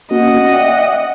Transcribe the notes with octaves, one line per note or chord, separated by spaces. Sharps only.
A#3 C#4 F#4 D#5 F#5
D5 E5 G5